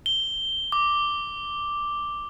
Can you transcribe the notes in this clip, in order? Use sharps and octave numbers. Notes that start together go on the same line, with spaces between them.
G7
D6